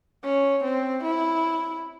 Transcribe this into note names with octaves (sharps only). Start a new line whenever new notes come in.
C#4
C4
E4